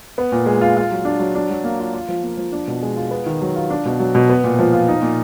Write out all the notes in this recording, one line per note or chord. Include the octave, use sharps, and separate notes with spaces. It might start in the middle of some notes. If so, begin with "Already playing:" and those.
B3
A#2
G#3
F4
F4
F#3
D4
F#3
D4
F#3
A#3
F4
F4
F3
A#3
F3
D4
B2
G#3
F4
B3
D#3
F#3
F4
D4
B2
F#3
B2
B3
A#2
F3
F4
D#4
A#2